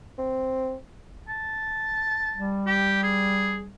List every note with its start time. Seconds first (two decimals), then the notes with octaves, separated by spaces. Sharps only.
0.18 C4
1.28 A5
2.36 G3
2.67 G4
3.03 G#4